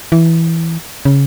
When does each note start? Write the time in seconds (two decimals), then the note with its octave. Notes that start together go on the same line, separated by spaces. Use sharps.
0.12 E3
1.05 C#3